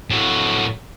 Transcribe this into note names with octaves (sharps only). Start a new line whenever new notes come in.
A2 F#4